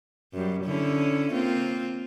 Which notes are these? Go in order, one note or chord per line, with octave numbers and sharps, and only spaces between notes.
F#2 G3
D3 C#4 E4
A#3 C4 F4